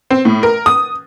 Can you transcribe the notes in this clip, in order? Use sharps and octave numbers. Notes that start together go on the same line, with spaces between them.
C4
A2
A#4
D#6